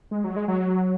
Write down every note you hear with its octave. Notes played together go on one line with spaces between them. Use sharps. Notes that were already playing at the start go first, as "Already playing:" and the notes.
G#3
F#3
G#3
F#3